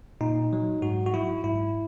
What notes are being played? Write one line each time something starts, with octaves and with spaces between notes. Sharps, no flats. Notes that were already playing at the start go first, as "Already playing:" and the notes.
A#2 D#4
F#3
G#2 F#4
F#4
F#3 E4
G#2 E4